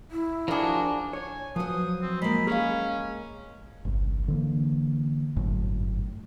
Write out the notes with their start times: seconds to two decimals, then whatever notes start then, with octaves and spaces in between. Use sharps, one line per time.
0.11 E4
0.48 F3 D4 F#4 G#4 A#4
1.13 C#5 G#5
1.56 F3 F#3 B4 C5 D#6
2.02 C4
2.22 G#3 A#3 B5
2.47 C#4 G#4 C#5 F5
3.85 G1 C2 G2
4.28 D3 E3 A#3
5.36 G1 F#2 A2